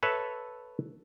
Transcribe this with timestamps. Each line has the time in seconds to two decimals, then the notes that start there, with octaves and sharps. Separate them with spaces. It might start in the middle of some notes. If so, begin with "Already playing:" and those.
0.03 A4 B4 C#5 E5 A5